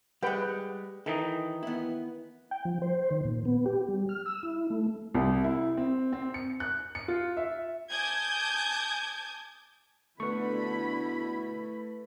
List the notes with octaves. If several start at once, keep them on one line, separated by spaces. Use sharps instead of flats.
G3 G#3 B4 F#5 G5
D#3 E3 D#4 A4
B3 E4
G5
F3
C5
D#3
A#2
B3
G4
G3
F6
E6
E4
A3
C2
E4
C4
C4
C#7
F#6
C#7
F4
E5
G#5 A5 D6 D#6 G6 G#6
B2 D3 A3 E4 B4 B5 C#6